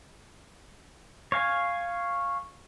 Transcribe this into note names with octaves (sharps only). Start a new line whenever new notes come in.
C#5 F5 G#5